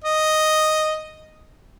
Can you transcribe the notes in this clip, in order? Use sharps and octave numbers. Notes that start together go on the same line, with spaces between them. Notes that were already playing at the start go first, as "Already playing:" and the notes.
D#5